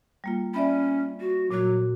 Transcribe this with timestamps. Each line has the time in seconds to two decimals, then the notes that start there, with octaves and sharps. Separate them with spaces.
0.24 G3 A#3 F4
0.54 C#4 D5 E5 B5
1.20 F#4
1.51 A#2 F#3 F#4